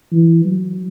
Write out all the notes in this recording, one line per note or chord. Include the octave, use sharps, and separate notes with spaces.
E3
F#3